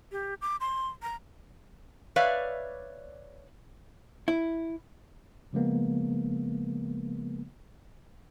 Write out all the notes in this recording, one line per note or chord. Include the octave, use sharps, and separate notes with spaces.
G4
D6
C6
A#5
B4 C#5 D5 E5 F5
E4
C#3 F3 G#3 A#3 B3